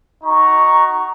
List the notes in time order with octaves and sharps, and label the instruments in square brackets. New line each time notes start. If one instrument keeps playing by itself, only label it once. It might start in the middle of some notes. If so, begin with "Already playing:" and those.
[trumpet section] D#4 F#4 A#5 C#6